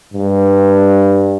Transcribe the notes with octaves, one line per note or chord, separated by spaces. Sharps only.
G2